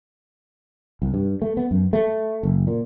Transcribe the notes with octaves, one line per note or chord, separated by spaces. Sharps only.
C2
G2
A3
B3
F#2
A3
F#1
A#2